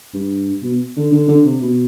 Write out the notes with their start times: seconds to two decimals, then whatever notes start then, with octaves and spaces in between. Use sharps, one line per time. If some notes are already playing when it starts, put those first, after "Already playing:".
0.14 G2
0.63 B2
0.97 D3
1.12 D3
1.28 D3
1.45 C3
1.62 B2